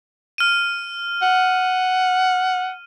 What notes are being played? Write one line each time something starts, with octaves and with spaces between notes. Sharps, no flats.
F6 D#7
F#5